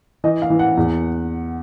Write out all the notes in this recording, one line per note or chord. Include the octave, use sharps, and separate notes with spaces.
E3 D#5
F5
E3
F#5
E2